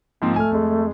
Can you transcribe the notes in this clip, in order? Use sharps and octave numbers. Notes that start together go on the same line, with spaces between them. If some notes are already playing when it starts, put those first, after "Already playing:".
G#2 F3 A#3 C4
A3 G#5 F6
F2 G#3